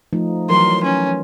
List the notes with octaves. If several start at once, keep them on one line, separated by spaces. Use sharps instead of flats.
F3 A3 D#4
E3 F#3 A#4 C6
C#4